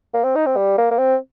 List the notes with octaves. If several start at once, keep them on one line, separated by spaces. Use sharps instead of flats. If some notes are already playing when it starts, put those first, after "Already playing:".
A#3
C4
D#4
C4
G3
A#3
A#3
C4